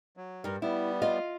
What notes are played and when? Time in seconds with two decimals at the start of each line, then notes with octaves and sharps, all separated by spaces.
0.17 F#3
0.44 G2 G3 A#4
0.62 G3 B3 E4
1.02 F4 D#5 F5